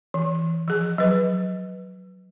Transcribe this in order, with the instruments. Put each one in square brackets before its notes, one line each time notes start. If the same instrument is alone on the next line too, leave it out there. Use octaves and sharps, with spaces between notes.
[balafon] E3
F3 G#4
F#3 B4